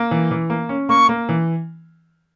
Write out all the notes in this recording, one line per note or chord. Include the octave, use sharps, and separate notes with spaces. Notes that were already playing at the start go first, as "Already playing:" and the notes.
Already playing: A#3
E3
E3
A#3
C#4
A#3 C#6
A#3
E3